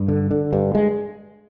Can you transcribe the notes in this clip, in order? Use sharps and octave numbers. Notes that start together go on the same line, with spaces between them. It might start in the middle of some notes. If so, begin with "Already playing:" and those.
Already playing: G2
D3
D3
G2
G#3